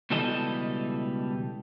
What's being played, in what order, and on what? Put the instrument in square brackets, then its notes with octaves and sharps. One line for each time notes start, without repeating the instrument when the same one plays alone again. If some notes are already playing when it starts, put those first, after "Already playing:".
[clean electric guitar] C#2 B2 E3 G3 A4 D#5